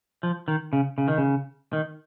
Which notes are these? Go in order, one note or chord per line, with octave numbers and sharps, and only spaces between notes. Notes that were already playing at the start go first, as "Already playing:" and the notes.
F3
D#3
C#3
C#3
D#3
C#3
D#3